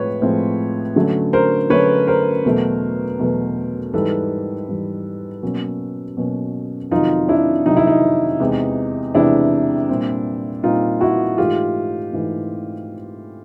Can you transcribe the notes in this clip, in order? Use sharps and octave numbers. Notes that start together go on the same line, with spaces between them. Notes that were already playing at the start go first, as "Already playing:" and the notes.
Already playing: A2 F3 G#3 C4 B4 C#5
A2 F3 G#3 C4
D3 F#3 A3 C#4
A#4 C5
D3 F#3 A3 C#4 B4 C#5
A#4 C5
E2 B2 F#3 A3
E2 B2 F#3 A3
G#2 E3 G3 A4 B4
G#2 E3 G3
B2 F#3 A#3 C#4
B2 F#3 A#3 C#4
F2 C3 D#3 F#3 D#4 F4
D4 E4
F2 C3 D#3 F#3 D#4
E4
D#4
E2 C3 E3 G#3
E2 C3 E3 G#3 D4 E4
A#2 G3 C4
A#2 G3 C4 D#4 F4
E4 F#4
G#2 E3 A3 F4 G4
G#2 E3 A3